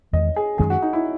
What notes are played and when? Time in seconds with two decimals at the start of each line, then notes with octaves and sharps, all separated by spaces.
0.13 E2 D#3 G#3 D#5
0.36 G#4
0.58 F#2 D#3 G#3 C#4 G#4
0.70 F#4
0.82 D#4
0.93 E4